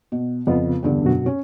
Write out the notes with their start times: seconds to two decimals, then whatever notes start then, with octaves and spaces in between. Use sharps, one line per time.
0.12 B2
0.47 F2 C#3 B3 F4
0.83 E2 G2 D3
1.03 F#2 B2 F#4
1.26 C#4